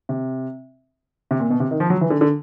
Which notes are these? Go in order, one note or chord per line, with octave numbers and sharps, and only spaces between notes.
C3
C3
A#2
B2
C3
D#3
F3
F#3
E3
D3
D3